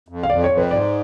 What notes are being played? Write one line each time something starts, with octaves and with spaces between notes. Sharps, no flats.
F2
F5
F2 D5
C#5
F2
B4
G#2 D5